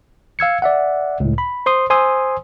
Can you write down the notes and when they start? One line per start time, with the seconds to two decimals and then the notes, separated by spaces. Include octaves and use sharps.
0.39 F5 E6 G#6 C#7
0.62 D5 E5 F#5
1.20 C#2 A2
1.38 B5
1.66 C5 C6 D#6
1.90 C5 G#5 C6 D#6 E6